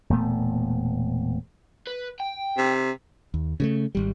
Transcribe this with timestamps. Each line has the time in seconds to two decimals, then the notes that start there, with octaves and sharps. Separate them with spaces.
0.10 E1 A#2 A3 B3
1.87 B4
2.20 G5
2.57 C3
3.34 D#2
3.60 C#3 G#3 A3
3.95 G#1 G3